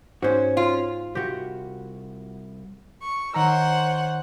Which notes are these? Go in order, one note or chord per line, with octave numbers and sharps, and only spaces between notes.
G#2 C#4 F#4 C5
F4
C2 F#4 G4
C#6
D#3 C5 C#5 F#5 A#5 E6